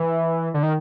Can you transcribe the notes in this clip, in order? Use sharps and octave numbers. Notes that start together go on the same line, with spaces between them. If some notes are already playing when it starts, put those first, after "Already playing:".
Already playing: E3
D3
D#3